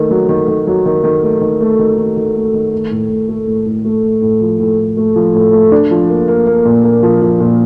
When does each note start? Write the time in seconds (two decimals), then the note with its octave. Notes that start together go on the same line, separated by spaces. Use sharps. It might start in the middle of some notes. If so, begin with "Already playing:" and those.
Already playing: D#3 A3
0.11 F#3
0.29 D#3
0.48 D#3
0.67 F#3
0.86 D#3
1.04 D#3
1.23 A3
1.41 D#3
1.61 A3
1.79 D#3
1.98 D#3
2.17 D#3
2.35 A3
2.54 D#3
2.73 A3
2.91 A2
3.10 A2
3.29 A3
3.47 A2
3.66 A2
3.85 A3
4.04 A2
4.22 A2
4.41 F3
4.60 A2
4.78 A2
4.97 A3
5.16 F3
5.34 A2
5.53 A3
5.72 D4
5.91 F3
6.09 A#3
6.28 A#3
6.47 A#3
6.65 A#2
6.84 A#3
7.03 F3
7.22 F3
7.40 A#2